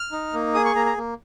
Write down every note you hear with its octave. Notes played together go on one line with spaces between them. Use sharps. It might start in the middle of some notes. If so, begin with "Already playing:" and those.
Already playing: F6
D#4
A#3
G#4 D#6
C#6
A#3 A#5
A#5
A#3